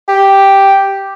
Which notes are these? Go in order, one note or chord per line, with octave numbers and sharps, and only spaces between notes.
G4